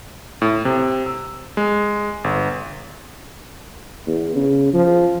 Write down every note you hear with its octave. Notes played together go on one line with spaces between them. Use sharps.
A2
C3
E6
G#3
G1
E2
C#3
F3